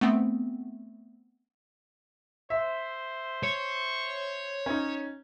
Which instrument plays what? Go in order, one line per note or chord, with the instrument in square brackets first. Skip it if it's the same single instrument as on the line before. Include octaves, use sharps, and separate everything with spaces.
[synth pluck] A3 B3 C4
[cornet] C5 [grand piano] E5
[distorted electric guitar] C#5
[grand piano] C#4 D#4